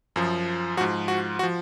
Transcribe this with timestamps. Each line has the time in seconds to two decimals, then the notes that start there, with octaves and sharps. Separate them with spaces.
0.16 F#2 F3
0.77 F3 F#4
0.81 G#2
1.08 F#4
1.39 F#4
1.43 F3